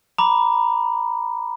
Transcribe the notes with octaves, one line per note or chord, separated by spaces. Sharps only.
A#5 B5 D6